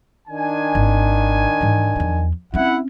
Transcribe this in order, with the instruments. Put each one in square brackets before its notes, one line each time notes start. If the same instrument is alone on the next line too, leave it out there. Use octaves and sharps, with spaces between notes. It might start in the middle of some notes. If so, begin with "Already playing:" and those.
[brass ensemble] D#3 D4 G#5
[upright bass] G#1
G#2 E3
E2 F3
[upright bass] C4 C#4 [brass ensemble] E4 F#5